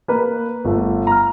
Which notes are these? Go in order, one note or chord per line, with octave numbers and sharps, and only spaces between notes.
A#3 B4
G1 A3
A#5 F6